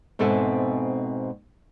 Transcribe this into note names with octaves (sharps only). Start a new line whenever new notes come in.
G#2 B2 C4 A4 E5 G#5